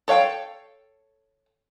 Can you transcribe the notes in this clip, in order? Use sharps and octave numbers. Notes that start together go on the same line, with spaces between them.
A4 C#5 F5 G5